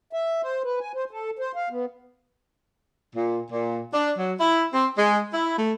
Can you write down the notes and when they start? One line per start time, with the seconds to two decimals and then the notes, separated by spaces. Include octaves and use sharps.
0.13 E5
0.42 C5
0.64 B4
0.80 G#5
0.94 C5
1.11 A4
1.39 C5
1.55 F5
1.70 B3
3.15 A#2
3.51 A#2
3.94 D4
4.19 F#3
4.40 E4
4.73 C4
4.97 G#3
5.33 E4
5.58 A3